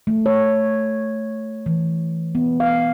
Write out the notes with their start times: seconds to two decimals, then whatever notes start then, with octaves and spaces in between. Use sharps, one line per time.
0.07 A3
0.26 C#5
1.66 E3
2.35 B3
2.60 F5